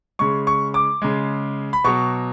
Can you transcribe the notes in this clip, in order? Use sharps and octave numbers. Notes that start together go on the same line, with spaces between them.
C#3 G#3 C#6
C#6
D6
C#3 G#3
B5
B2 F#3 C#6